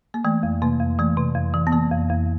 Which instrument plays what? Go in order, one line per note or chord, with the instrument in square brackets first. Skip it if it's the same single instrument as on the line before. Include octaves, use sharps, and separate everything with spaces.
[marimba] A#3
E3 A3
F2
C3 A#3
F2
E3 A3
C3
F2
E3
B3
E3 A#3
F2
F2